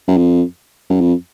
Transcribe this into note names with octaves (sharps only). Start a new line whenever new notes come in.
F#2
F2
F#2
F2